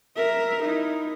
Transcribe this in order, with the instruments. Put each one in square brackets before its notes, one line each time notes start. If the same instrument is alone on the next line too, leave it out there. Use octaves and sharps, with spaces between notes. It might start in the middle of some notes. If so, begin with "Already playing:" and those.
[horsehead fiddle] A#4 E5
D#4 E4